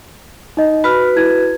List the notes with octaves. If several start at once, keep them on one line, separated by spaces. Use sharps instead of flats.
D#4 D#5
F#4 B4 B5 F6
E4 G#6